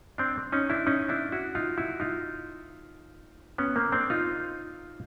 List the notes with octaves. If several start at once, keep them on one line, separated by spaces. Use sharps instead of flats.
C4 D4
C#4 D#4
D4 E4
C#4 D#4
D4 E4
E4 F#4
D#4 F4
E4 F#4
D#4 F4
B3 C#4
A#3 C4
C4 D4
D#4 F4